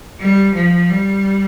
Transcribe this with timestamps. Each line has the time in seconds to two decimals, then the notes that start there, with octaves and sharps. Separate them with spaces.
0.20 G3
0.54 F3
0.89 G3